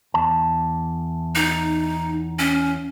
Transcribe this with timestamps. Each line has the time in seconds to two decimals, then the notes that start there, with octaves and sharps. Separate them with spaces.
0.14 E2 A5
1.35 D#4
2.39 C#4